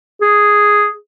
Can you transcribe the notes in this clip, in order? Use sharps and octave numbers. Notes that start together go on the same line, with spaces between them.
G#4